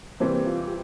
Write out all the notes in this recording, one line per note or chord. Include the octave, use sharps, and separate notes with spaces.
C3 E3 G3 A#3 C4
F4
G4